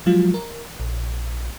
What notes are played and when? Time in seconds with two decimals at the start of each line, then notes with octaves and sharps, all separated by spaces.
0.06 F3 F#3 G#3 F4
0.34 A#4
0.80 A#1